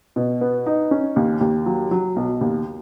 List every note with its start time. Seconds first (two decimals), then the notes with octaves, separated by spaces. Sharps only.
0.16 B2
0.41 B3
0.66 D#4
0.91 C#4
1.16 D#2
1.41 D#2
1.66 F#3
1.91 F#3
2.16 B1
2.41 D#2